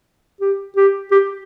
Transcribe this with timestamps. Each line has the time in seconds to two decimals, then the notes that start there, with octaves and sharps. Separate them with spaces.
0.41 G4
0.76 G4
1.11 G4